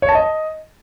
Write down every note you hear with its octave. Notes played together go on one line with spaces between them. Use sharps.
C#5
A5
D#5